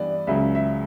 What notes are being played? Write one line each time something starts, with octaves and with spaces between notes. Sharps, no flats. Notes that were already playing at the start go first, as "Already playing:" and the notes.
Already playing: G2 E3 G3 B3 D5
C#2 C#3 F#3 E5
E5